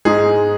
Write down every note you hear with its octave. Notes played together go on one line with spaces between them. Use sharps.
G#2 G#3 D#4 G#4